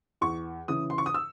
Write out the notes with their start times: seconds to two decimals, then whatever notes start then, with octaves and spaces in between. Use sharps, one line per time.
0.21 E2 C#6
0.68 C#3 E3 D#6
0.90 C6
0.98 C#6
1.06 D#6
1.14 E6